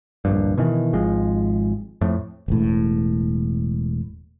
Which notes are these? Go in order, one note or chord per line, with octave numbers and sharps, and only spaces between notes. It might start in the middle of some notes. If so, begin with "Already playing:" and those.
D1 A#1 G2
B2 D#3 E3
G#1 F3 G#3
F2 A2
E1 A2